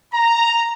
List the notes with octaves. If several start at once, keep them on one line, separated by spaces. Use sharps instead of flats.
A#5